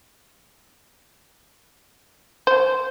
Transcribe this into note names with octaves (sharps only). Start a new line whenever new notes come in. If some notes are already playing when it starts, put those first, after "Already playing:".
C5